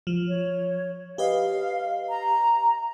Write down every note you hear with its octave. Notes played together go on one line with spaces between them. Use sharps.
F3
C#5
G4 B4 D#5 F5
A#5